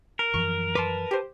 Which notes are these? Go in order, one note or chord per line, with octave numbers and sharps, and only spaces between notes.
A#4
F#2 E3 F3 C#6
B4 A5 C6 D6
G4 C5